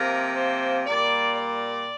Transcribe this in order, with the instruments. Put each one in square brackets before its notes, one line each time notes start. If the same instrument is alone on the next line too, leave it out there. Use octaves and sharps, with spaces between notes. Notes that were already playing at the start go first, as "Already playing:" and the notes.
Already playing: [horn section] C3 F3 A#3 A#4
C5
A#2 G3 A#3 D5
D5